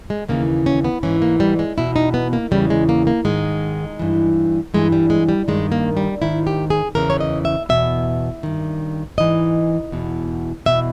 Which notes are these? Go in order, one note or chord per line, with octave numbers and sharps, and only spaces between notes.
G#3
D#2 C#3 E3 A#3
C#4
B3
G#2 E3 C#4
A#3
G3
G#3
E2 B2 E4
D#4
B3
A#3
E2 C#3 E3 G3
G#3
A#3
A#3
G#2 D#3 G#3
G2 E3
G2 E3 G#3
G3
G#3
G3
G2 D#3 G#3
A#3
G3
G#2 D#3 E4
G4
G#4
E2 C#3 E3 A#4
C#5
D#5
E5
E2 B2 E5
G2 D#3
G#2 E3 D#5
E2 B2
E2 B2 E5